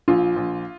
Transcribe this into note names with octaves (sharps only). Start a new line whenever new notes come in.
A#1 F4
A#1